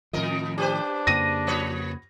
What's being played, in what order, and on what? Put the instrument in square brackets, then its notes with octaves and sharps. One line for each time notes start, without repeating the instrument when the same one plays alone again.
[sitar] F2 A#4 D#5 [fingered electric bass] A2 D#3 F3
[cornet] D4 [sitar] G4 B4 C5
[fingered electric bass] F2 C#3 A#3 [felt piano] A#6 D#7
[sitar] F3 B4 C#5